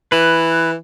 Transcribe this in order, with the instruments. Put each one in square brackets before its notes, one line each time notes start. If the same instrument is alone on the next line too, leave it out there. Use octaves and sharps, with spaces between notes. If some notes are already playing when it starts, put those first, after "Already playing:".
[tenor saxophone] E3 [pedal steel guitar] B4